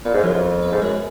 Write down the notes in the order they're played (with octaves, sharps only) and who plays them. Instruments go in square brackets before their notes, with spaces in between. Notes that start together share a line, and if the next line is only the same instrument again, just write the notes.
[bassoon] A#2 [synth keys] B3
[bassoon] G#2
[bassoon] F#2 [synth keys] F3
[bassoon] F2
[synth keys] D#2
B3
[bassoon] G#2
[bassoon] F#2 [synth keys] G#3